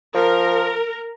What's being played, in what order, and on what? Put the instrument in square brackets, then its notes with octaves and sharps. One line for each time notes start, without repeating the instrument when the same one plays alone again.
[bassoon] F3 [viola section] A#4